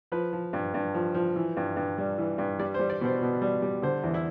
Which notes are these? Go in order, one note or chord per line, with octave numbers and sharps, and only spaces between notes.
F3 B4
F3
G2
G2
F3
F3
E3
G2
G2
G3
E3
G2
G3 D5
C5
G3
D5
B2 C5
B2
G3
G3
D3 C5
E2
E4